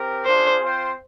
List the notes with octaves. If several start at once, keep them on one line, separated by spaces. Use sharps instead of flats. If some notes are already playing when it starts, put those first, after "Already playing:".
Already playing: C4 G4 A#4
D4 F4 G#4 C5
C4 F4 C5 G5